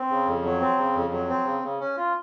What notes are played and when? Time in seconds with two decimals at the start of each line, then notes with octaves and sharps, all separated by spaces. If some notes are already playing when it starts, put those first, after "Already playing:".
Already playing: C4
0.10 C#3
0.27 F2
0.44 F#3
0.61 C4
0.78 C#3
0.95 F2
1.12 F#3
1.29 C4
1.46 C#3
1.63 C#3
1.80 C#4
1.97 F4